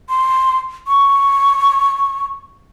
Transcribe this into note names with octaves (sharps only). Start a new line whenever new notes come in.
C6
C#6